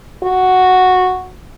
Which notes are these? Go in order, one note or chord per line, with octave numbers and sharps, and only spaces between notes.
F#4